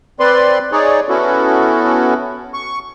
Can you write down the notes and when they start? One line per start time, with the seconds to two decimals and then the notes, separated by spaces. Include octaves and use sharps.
0.20 C4 B4 D5 C6
0.72 D#4 G#4 C#5 D5
1.09 B3 C#4 E4 F#4 A4
2.54 C#6